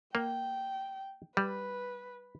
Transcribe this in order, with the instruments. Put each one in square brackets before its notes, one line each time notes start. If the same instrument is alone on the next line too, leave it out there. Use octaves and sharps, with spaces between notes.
[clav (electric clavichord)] A#3 [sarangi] G5
[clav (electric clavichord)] G3 [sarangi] B4